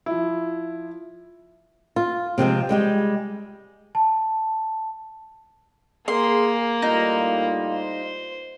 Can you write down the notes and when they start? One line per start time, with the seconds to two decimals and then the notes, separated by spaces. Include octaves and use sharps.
0.06 F3 E4
1.96 F4
2.38 C3 F3 G#3 C4
2.69 G3 G#3 G4
3.95 A5
6.08 A#3 G#4 C6
6.82 A2 G3 D#4 F4
7.72 C5